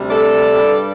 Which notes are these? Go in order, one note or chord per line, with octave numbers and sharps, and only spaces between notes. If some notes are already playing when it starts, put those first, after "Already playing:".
Already playing: D2 C3 G3
A4 D5
G2 G3